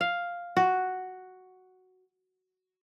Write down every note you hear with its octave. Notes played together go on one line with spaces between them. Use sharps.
F5
F#4